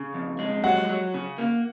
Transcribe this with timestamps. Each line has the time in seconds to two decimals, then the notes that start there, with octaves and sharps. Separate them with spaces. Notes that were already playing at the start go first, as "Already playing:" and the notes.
Already playing: C#3
0.14 F2
0.39 G#3
0.64 F#3 F#5
0.89 F#3
1.14 C#3
1.38 A#3